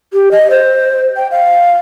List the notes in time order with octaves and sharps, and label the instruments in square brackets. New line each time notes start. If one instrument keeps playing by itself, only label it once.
[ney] G4
D#5
C5
G5
F5